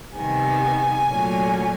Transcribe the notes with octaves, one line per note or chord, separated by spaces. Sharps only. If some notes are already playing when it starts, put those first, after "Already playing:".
C3 D#3 G3 B3 G#5
A#2 F#3 A3 C#4